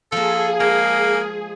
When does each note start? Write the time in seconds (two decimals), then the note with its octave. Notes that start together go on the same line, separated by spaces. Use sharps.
0.12 F3 A#3 G#4 A4
0.60 G#3 A#3